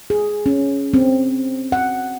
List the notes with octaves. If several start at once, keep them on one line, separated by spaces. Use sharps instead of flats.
G#4
C#4
C4
F#5